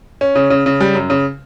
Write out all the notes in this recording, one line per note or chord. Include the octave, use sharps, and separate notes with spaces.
C#4
C#3
C#3
C#3
G3
F#2
C#3